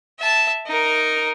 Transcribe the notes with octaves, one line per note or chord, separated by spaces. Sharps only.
E5 A5
D#4 A#4